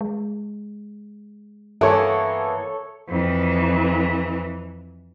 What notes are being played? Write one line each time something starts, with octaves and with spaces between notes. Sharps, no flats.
G#3
G2 E3 A#3 B3 A4 C#5
F2 E3